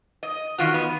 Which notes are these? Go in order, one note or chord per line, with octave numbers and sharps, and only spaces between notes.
D#5
D#3 F4 F#4
B3